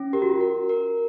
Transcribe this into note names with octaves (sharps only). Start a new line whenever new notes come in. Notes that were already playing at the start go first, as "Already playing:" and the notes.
Already playing: C#4
G4 A#4
F#4
F4
F#4 A#4
A#4